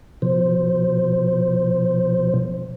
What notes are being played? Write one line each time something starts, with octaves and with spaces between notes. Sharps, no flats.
B2 F3 C5